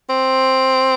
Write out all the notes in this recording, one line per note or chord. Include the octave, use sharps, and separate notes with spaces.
C4